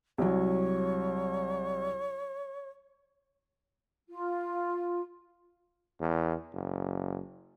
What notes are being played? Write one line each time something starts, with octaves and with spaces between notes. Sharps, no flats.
C2 F#3 C#5
F4
E2
F#1